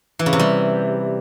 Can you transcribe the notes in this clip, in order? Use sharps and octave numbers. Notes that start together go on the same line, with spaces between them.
E3
C#3
C3
G3